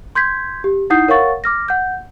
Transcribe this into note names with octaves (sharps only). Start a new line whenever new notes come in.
C6 G6 G#6 B6
G4
D#4 E4 F#5 D#6 G6 C7
A#4 C#5 F5 F#5 C#6 A6
D6 F6 A#6
F#5 G6